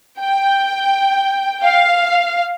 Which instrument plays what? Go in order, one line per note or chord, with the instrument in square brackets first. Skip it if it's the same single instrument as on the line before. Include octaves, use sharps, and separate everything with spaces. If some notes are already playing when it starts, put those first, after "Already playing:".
[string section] G5
F5